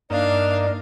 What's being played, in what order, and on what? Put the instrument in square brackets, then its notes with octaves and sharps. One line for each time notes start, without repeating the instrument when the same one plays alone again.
[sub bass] G2 [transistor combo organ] A#3 D#4 [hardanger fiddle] D4 F5 [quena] D5